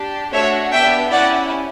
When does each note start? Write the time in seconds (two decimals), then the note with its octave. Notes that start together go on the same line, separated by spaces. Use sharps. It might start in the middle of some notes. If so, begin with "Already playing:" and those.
Already playing: D4 G4
0.33 A3 D4 F#4 C#5 E5
0.72 B3 D4 G4 E5 G5
1.11 C#4 E4 G4 D5 F#5